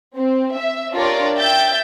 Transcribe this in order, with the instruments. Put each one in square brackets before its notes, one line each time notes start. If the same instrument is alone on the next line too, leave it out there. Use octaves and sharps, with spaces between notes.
[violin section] C4
E5
D4 F4 G4 A#4 C#5 D5
E5 G5 G6 A6